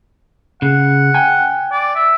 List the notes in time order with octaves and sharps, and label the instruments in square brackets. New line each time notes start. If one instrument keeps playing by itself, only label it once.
[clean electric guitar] C#3 [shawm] F#5
[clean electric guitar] G5 G#5
[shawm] D5
E5